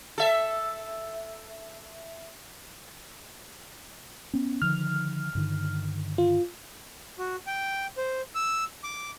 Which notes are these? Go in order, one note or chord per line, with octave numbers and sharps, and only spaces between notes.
A4 E5
B3 C#4
D3 D#3 F3 F6
G2 D3 D#3
F4
F#4
G5
C5
E6
D6